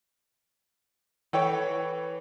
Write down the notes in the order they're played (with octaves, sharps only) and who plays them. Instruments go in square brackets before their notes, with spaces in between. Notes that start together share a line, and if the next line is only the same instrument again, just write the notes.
[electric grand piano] E3 C#5 [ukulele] A4 B4 G5